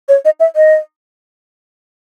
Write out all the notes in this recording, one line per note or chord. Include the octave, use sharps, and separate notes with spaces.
C#5
D#5
E5
D#5